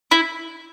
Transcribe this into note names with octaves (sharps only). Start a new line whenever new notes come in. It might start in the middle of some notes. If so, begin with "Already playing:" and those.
E4